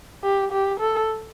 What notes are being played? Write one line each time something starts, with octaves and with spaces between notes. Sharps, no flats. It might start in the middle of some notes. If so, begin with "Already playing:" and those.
G4
G4
A4